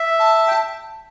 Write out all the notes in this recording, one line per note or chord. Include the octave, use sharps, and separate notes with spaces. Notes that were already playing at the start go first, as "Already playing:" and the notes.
Already playing: E5
A5
G5